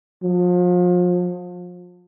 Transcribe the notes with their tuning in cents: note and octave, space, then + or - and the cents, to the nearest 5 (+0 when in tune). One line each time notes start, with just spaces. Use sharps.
F3 +35